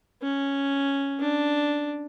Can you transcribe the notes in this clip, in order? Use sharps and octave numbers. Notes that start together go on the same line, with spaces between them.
C#4
D4